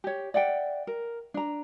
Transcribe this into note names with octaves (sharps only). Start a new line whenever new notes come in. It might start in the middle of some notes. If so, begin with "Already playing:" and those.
G4 C#5
D5 E5 F#5 G5
A#4
D4 A#5